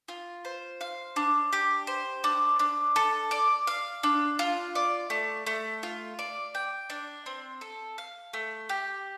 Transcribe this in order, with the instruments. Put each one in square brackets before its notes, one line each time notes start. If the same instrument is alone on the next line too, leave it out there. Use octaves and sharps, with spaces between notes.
[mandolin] F4
C5
F5
D4
G4
C5
D4
D4
A4
D5
F5
D4
F4
D5
A3
A3
F4
D5
G5
D4
C4
A4
F5
A3
G4